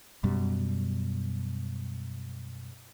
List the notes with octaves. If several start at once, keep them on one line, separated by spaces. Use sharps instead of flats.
F#2 B2 G3